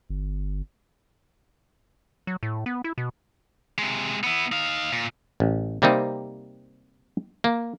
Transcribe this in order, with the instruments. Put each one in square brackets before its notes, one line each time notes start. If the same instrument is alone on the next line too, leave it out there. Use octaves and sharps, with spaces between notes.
[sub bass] G1
[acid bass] F#3
A2
B3
E4
B2
[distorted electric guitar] C3 G#3
B3 E4
D#4 F5
A#2
[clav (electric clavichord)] A1
C3 G3 A#3 C4 D#4
A#3